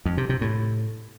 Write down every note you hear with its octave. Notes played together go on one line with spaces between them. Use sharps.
F2
C3
C3
A2